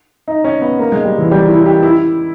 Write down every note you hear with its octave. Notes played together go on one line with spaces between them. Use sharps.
D#4
C#4
B3
A#3
G#3
G3
E3
G3
E4
G4
E4